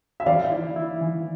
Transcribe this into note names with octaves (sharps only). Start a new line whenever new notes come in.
E5
E3 D5 F5
E4
E4
E3